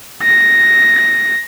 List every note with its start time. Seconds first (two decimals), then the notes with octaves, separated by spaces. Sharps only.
0.22 A#6